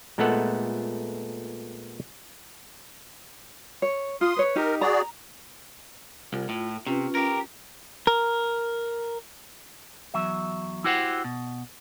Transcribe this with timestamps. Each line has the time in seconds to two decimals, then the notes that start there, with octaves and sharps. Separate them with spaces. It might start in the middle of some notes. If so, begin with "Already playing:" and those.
0.18 A#2 G#3 A3 B3 A4 F#5
3.82 C#5
4.21 F4 C6 D#6
4.36 B4 C#5
4.56 D#4 G4 A#4
4.81 F#4 G#4 D5 A#5
6.33 C2 F4
6.49 A2
6.87 C3 C#4 F4 B4
7.15 G4 A#4
8.07 A#4
10.14 E2 F#3 E5
10.84 E4 F#4 G4 C5 C#5 F#5
11.24 B2